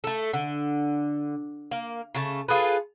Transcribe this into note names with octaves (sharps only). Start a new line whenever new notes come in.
A3 A4
D3
A#3
C#3 A3 A5
F4 G#4 A4 B4